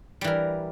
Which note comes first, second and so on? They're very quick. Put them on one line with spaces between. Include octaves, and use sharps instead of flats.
G3 E3 A#4